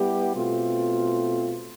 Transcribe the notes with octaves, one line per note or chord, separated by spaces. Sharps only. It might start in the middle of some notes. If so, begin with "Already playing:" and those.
Already playing: G3 B3 E4 G4
B2 A3 C4 F4